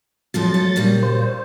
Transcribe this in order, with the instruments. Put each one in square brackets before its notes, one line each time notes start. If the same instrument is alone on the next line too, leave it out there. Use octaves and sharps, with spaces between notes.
[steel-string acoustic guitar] F2 F3 A3 [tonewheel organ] F#3 A6
[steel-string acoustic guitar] A3
A#2 C#3 G3
[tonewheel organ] C5